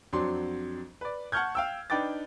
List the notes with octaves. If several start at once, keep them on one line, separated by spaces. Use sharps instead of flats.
F2 F#3 C4 D4 C6
B4 D5
F#5 A5 C#6 F6 G6 G#6
F5 G5 E6
D4 D#4 B4 G5 D6 A6